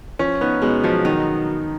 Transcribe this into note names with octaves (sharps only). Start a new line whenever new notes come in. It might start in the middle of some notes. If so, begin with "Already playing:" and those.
F3 C#4
B3 D#4
B2 G#3
F3 F#3
D#3 D#4